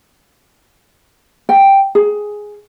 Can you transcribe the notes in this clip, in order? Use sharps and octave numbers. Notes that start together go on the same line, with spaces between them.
G5
G#4